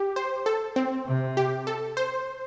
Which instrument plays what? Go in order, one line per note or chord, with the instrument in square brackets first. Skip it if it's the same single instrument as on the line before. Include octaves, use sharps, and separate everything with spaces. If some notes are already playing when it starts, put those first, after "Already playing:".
Already playing: [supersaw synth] G4
C5
A4
C4
[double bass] C3
[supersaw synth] G4
A4
C5